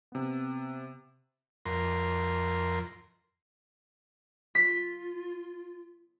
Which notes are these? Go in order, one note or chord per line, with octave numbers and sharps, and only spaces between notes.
C3 B3
F2 A#4 C6
F4 B6